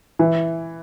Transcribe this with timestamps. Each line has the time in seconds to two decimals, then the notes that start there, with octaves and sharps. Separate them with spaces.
0.19 E3